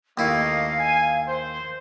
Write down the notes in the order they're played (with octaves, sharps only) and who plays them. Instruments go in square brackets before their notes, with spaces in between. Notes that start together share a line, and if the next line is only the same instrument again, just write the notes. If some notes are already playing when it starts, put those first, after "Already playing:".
[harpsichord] D#2 E4 [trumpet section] A3 A#3 D#5 [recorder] F5
[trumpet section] G#5
C5